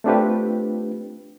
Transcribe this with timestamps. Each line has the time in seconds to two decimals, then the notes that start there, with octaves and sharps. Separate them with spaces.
0.04 A3 C4 D4 F4 G4 B4